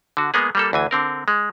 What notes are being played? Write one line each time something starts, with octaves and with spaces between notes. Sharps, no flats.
D3 F#4
G#3 A#3 B3 G#4
G3 A#3 A4
D2 E3 G#5
D3 C4 A#4
G#3